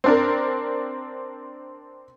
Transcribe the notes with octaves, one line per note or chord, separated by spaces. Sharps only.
C4 D4 A#4